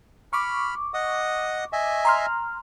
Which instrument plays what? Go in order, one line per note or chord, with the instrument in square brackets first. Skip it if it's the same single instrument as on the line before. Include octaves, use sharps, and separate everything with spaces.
[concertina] B5 F6 [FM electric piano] C#6 D6
[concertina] D#5 F#5 D#6
D#5 E5 G#5
[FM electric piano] A#5 C6 F6